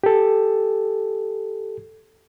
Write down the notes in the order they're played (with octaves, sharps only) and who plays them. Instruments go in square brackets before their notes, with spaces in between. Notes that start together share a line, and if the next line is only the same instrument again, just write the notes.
[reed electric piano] G4 A4